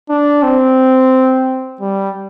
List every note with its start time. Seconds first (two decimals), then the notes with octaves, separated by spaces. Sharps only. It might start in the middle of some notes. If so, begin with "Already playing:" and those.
0.09 D4
0.43 C4
1.81 G3